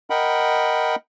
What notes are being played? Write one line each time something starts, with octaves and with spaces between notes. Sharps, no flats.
A#4 D#5 F#5 G5 B5